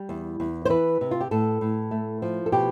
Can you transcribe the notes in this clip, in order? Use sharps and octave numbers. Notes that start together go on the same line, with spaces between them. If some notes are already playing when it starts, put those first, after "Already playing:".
Already playing: G3
E2
E2
C5
E3 B4
C3
F4
G4
A2 A4
A2
A3
F3
A4
B2 G4